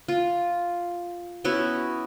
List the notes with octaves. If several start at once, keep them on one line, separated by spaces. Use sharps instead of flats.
F4
B3 C#4 E4 F#4